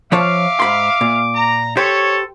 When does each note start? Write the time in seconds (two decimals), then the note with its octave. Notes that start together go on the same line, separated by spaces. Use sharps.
0.12 F3 C#5 E5 F5 A5 D6
0.60 G#2 B5 C6
1.01 A#2
1.35 A#5
1.77 G4 A4 C5 C#5